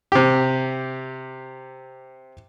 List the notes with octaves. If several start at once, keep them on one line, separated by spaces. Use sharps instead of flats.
C3 G4